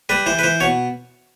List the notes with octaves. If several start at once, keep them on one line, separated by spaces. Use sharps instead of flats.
G3 B4
E3 C5
B4
E3 C5
B2 C#5